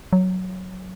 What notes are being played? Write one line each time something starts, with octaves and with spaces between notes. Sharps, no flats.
F#3